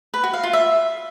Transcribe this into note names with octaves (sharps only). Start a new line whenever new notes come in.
B4
F#4
F5
F4
E5